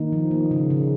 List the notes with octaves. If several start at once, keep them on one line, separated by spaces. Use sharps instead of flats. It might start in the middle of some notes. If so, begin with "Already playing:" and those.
Already playing: D#3 A#3 D#4
F3
A#3
C#3
C#3